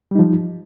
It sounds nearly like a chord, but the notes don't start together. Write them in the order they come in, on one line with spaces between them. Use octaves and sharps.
G3 D#4 F3